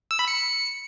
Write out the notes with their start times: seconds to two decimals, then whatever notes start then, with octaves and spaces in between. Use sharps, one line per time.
0.11 E6
0.19 B5
0.28 C#7